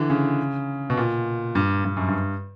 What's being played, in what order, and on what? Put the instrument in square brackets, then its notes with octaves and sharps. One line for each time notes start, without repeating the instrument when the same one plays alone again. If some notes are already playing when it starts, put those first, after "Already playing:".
Already playing: [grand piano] D3 E3
C#3
B2
A#2
G2
G2
F#2
G2